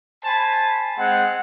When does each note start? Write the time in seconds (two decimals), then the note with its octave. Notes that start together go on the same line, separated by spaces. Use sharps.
0.25 C5 G#5 A5 B5
0.98 G#3 C4 F#5